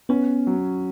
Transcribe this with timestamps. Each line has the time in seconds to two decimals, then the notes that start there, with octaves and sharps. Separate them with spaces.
0.09 B3 C#4
0.47 F#3